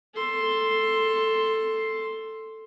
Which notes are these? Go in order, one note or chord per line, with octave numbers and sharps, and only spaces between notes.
A4 C6